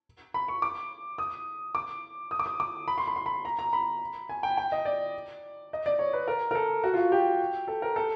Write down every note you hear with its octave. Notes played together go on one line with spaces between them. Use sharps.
B5
C#6
D6
D#6
D6
D#6
D6
D#6
D6
B5
C6
B5
C6
B5
A#5
A#5
B5
G#5
G5
G5
D#5
D5
D#5
D5
C#5
B4
A#4
A#4
A4
F#4
F4
F#4
G4
A4
A#4
A4